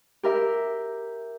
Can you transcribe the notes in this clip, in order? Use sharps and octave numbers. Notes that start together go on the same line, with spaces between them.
G4 A#4 E5